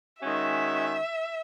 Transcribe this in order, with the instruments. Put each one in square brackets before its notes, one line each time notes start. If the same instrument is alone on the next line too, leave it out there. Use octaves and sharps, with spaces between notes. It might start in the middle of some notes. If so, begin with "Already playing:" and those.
[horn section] D#3 G#3 C#4 F#4 [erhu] E5